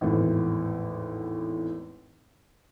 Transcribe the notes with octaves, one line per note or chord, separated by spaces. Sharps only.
G#1 E2 A2